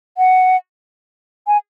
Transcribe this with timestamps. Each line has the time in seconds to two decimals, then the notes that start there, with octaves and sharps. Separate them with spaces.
0.18 F#5
1.47 G#5